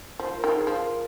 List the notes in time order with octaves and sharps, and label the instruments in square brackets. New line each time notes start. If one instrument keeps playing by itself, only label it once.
[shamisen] F3 [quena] C5
[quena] A#4
[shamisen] D#3
[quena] G#4
[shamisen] F3
[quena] A#4